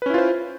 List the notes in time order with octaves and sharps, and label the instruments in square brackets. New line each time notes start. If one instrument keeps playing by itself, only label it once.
[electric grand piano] B4
C#4
E4
F4
C5